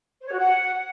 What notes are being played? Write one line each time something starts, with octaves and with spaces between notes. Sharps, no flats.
C5
C#5
F#4
F#5